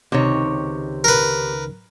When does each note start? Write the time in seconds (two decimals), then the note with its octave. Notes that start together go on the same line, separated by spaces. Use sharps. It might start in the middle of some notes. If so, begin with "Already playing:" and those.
0.12 C#2 C3 D#3 D#4 C#5
1.04 A#4 B4